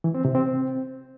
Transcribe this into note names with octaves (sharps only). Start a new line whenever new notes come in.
E3
C4
C3
C4